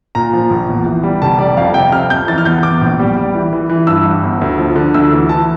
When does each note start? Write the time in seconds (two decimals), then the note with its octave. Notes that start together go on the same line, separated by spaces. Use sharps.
0.15 A#2 A#5
0.33 F3
0.50 A#1
0.69 E2
0.86 E3
1.03 G3
1.22 F1 A5
1.39 G3 D5
1.57 F2 F5
1.74 C3 G5
1.92 C3 F6
2.10 F2 G6
2.28 E3 A6
2.38 F6
2.45 E2 G6
2.63 E2 D6
2.81 A#1
2.99 G3
3.17 G3
3.35 E3
3.53 E3
3.69 E3
3.87 G2 E6
4.05 G2
4.23 G1
4.41 D2
4.58 F3
4.76 D3
4.94 D2 E6
5.12 E3
5.29 E3 A5